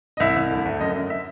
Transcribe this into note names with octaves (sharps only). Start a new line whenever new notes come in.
D#5
C2 E5
C2
D2
D2
F#2 D#5
F#2
E5